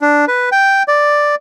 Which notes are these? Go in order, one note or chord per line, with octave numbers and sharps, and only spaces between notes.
D4
B4
G5
D5